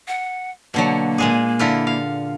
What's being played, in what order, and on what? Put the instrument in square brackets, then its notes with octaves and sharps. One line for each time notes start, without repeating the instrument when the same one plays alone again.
[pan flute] F#5
[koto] B2 D3 F#3 [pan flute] A#3
[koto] A#2 G#3 G#4
D3 E4 F4
F5